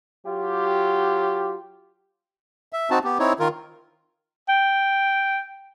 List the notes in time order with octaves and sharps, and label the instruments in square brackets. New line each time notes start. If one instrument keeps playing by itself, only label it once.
[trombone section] F#3 F4 G4
[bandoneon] E5
C4 D#4 F#4 A5
B3 G4
C4 D#4 E4 C#5
D#3 F4 A#4
[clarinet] G5